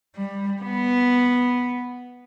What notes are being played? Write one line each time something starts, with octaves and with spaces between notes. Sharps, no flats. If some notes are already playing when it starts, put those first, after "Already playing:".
G3
B3